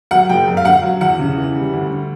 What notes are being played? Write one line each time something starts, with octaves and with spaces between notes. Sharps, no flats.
F#3 F#5
F#1 G5
F#2
F5
D3 F#5
F#3
E2 F#5
C#3
E3
G3
D2
D3